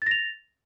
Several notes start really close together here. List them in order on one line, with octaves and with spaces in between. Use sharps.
A6 A#6 F7